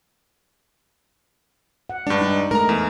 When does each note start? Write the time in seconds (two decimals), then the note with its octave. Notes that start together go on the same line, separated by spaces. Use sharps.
1.90 F#5
2.07 G2 G#3 D4
2.21 D#4
2.51 G#3 A3 D#4 A#4 A#5
2.69 E2